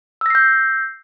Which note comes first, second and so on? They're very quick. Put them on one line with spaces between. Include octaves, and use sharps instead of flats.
E6 A#6 C7 G6